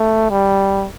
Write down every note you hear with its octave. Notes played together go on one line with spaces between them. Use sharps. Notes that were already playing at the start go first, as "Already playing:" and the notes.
Already playing: A3
G3